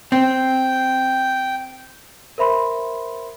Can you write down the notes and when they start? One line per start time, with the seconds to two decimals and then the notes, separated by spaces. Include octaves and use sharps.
0.12 C4 G5
2.38 A#4 C5 E5 B5 C6